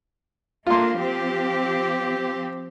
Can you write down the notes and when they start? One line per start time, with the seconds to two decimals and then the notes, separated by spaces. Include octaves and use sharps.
0.67 A3 A#3 D4 F4 C6
0.99 F3 C4 G4